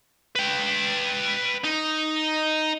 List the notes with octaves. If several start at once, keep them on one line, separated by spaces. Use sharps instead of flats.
B4 G5
D#4